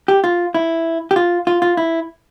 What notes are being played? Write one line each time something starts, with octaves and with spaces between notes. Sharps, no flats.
G4
F4
E4
G4
F4
F4
F4
E4